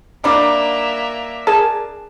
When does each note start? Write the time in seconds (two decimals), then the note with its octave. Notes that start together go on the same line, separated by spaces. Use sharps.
0.24 G3 A#3 D4 D#4 E5 D6
1.47 G#4 A#4 G#5 A5